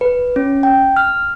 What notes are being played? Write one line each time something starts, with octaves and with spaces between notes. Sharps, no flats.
B4
C#4
G5
F6